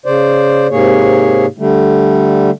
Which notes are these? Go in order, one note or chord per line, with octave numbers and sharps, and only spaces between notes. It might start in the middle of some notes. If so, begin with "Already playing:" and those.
C#3 C5 D5
G#2 C3 A#3 G#4 C#5
D3 G3 A3